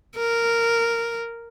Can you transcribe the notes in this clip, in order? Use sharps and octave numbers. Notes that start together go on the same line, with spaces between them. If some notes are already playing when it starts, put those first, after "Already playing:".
A#4